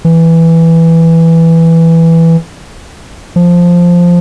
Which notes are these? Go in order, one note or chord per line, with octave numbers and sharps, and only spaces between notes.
E3
F3